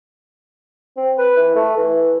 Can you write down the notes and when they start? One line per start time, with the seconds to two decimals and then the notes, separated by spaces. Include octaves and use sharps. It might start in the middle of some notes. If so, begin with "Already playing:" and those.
0.97 C4
1.18 B4
1.37 E3
1.56 A3
1.77 E3